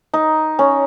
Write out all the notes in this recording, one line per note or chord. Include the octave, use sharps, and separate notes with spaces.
D#4
C#4